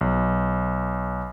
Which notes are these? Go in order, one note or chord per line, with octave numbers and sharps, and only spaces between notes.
B1